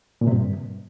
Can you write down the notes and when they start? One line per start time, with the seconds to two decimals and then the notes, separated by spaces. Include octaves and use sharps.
0.21 A#2
0.27 C3
0.32 G2